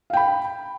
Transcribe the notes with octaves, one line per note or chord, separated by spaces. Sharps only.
F5 G5 B5